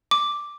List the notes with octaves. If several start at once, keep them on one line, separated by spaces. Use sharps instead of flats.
D6